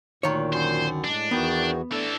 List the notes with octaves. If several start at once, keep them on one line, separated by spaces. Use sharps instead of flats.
D2 A#2 D#3 C#5
F#2 C5
A2 G#3 D4
E2 D#3 E3 B3 F#4
E3 A3 D4 A4